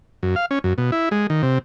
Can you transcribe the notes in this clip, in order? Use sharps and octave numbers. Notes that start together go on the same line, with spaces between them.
F#2
F5
C#4
F#2
B2
E4
G#3
D#3
C3